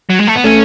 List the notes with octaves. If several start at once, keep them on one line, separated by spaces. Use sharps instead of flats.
F#3
G#3
A3
B3
A3 C#4